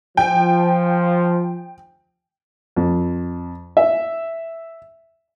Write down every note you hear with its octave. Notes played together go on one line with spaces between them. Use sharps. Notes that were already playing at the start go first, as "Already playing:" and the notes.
F3 G5 G#5
F2
E5